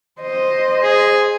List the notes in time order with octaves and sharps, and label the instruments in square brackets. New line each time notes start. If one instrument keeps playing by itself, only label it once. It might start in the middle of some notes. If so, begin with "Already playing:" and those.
[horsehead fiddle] C5 D#5
[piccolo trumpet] G#4